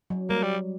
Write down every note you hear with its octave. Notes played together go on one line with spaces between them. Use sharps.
F#3
G3 A#3
G3